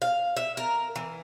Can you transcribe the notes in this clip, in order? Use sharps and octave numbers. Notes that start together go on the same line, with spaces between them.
F5
E5
A#4
E3